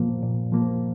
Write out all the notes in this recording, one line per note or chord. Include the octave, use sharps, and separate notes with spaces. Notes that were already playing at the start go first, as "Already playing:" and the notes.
Already playing: A#2 F3 A#3
A#2
F3 A#3